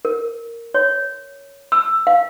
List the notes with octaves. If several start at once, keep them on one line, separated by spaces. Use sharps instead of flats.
A#4
C#5
E6
F5